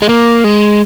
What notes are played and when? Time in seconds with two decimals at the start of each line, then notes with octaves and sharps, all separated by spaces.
0.02 G#3
0.09 A#3
0.44 G#3